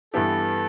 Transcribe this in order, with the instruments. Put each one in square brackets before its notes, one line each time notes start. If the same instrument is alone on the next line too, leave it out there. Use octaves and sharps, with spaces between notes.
[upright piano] G2 E3 B3 E4 G4 [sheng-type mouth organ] A4